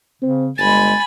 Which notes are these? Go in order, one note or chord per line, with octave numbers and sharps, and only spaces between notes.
C#3 C4
G1 G#3 G#5 B5 A6